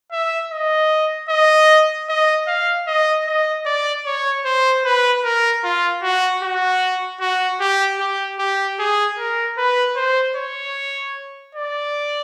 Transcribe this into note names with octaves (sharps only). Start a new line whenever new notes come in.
E5
D#5
D#5
D#5
F5
D#5
D#5
D5
C#5
C5
B4
A#4
F4
F#4
F#4
F#4
G4
G4
G4
G#4
A#4
B4
C5
C#5
D5